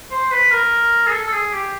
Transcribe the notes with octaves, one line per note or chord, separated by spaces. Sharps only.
C5
B4
A#4
G#4
A4
A4
G#4
G4